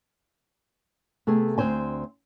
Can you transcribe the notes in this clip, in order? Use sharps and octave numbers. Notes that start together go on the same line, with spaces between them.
C3 A3 B3 G#4
D2 G#2 C4 C5 G#5